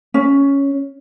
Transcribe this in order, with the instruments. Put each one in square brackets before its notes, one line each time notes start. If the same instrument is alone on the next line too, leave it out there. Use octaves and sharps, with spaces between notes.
[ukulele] C#4